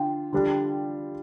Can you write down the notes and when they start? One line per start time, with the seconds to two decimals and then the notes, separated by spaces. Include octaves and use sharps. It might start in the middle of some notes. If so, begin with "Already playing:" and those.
Already playing: D3 D4 F4 G5
0.33 D3 G3 D4 G4